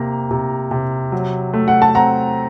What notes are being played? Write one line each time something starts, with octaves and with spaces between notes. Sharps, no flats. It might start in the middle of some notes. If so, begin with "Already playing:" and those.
Already playing: C3 A#3 A#5
C3
C3
F#3
A3
F#5
A5
C4 F#5 A#5